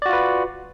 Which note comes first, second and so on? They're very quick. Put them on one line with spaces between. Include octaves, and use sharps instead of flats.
D5 F#4 F4 B4